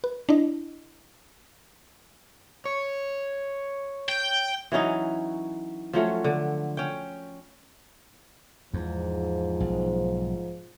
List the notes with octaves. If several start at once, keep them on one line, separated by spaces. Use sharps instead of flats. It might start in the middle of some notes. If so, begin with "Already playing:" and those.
B4
D4 E4 D#5
C#5
G5
E3 F#3 C#4 D#4
F3 F#3 A3 C#4
D3
C#4 G5
E2 G#2 F3
B1